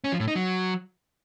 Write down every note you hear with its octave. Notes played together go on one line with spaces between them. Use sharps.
C#4
F3
A2
D#4
F#3